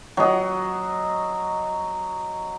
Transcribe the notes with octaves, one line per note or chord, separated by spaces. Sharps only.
F#3 D#5